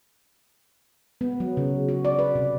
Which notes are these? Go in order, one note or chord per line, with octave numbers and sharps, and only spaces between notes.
B3
F#3
C#3
F#4
D5
B4
C3